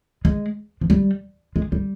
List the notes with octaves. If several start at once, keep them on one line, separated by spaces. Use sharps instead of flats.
G#3
F3
G3
G#3
G3